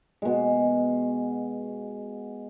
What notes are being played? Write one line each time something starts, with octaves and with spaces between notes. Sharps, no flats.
B2 G#3